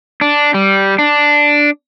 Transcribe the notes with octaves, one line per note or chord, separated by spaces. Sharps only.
D4
G3
D4